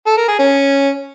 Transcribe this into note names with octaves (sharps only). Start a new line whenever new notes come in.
A4
A#4
G#4
C#4